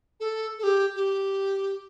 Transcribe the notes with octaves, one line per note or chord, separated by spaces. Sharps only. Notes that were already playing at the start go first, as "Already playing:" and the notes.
A4
A4
G4
G4